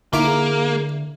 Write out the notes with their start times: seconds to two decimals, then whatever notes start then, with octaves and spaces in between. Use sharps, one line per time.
0.13 D3 A#3 D#4 E4 D6
0.25 G#4